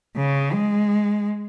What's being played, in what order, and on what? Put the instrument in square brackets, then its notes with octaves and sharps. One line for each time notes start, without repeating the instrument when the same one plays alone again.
[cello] C#3
G#3